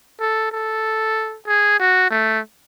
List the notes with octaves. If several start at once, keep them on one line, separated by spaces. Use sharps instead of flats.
A4
A4
G#4
F#4
A3